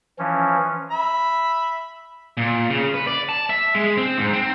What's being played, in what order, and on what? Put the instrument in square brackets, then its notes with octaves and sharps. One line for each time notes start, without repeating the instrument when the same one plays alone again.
[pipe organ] E3 F3 C#4
[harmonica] E5 B5
[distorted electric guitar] A#2
C#3
B4
D5
A5
E5
G#3
C4
G#2
C4